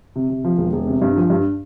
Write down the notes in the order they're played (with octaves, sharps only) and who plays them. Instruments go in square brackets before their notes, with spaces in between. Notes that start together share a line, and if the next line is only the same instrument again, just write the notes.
[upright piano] C3
C3
F3
E1
E1
C3
G2
F3
G2